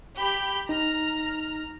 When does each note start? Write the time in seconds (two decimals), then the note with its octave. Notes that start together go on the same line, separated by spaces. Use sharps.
0.17 G4 B5 G6
0.69 D#4 A#5 F6